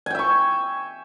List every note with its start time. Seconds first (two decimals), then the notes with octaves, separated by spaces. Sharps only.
0.06 G#5
0.10 G5
0.15 E5
0.19 C#6